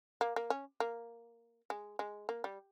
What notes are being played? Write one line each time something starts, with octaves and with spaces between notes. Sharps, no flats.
A#3
A#3
C#4
A#3
G#3
G#3
A#3
G3